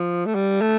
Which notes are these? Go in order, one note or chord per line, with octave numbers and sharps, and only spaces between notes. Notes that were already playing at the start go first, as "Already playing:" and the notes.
Already playing: F3
A3
G3
A3